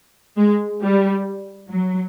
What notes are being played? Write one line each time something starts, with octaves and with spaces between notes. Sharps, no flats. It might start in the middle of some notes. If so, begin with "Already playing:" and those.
G#3
G3
F#3